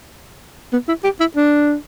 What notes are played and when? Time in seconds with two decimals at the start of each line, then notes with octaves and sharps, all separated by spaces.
0.73 B3
0.88 E4
1.04 G4
1.20 E4
1.36 D4